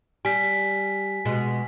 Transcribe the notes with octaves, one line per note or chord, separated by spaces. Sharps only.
G3 G#5 B6
B2 G#3